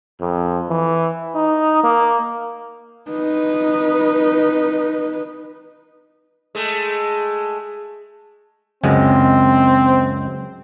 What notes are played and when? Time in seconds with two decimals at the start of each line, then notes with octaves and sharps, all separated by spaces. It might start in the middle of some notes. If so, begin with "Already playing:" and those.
0.20 F2
0.69 E3
1.35 D#4
1.84 A#3
3.11 D#4 B4
6.55 G#3 A3
8.83 C#2 F#2 G#3 C4